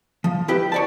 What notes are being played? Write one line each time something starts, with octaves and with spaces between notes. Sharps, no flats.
F3
E4 G4 B4
C#5 D5 A5